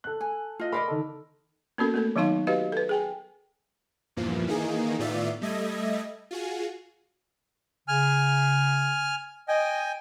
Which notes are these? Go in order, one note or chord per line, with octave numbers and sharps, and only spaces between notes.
A4 F#6
G#5
F4 D#5
A#4 D5 D#5 B5 C6
D#3 A4
A#3 B3 C#4 F#4 A4 A#4
A3 A#3 A4
D#3 F#3 B3 D#4 F5 C6
F#4 G4 B4 D#5 F5
A4 B4
G#4 G5 G#5
E2 G2 A#2 E3 F3
D#3 E3 A#3 D#4 G#4
A2 D#3 B3 F4 D5 E5
G3 A3 D#5 E5 G#6 A#6
F4 F#4 G#4
C#3 G#5 F6
D#5 G5 G#5